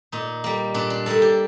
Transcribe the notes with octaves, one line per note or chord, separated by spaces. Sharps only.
A#2 D#4
G3 A#3
A#2 D4
D4
G3 A#3 A4
G4